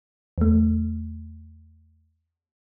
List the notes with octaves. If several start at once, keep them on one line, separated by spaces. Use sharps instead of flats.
E2 A3